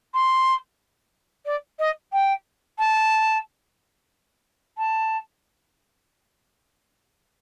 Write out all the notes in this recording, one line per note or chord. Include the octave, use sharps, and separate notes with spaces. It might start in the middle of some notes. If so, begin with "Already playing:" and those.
C6
D5
D#5
G5
A5
A5